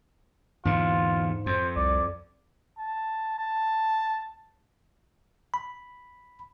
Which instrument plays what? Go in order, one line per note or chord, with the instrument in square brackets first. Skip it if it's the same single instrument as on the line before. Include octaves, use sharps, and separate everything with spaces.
[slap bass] E2 D3 [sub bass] G#2 [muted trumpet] F4
[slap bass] F2 [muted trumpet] C5
[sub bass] C2 [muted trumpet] D5
[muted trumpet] A5
A5
[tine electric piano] B5